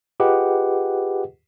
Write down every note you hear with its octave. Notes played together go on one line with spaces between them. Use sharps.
F4 G4 G#4 B4 D#5 F#5